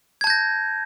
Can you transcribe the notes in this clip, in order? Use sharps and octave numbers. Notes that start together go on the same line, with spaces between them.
A5 G6 G#6 A#6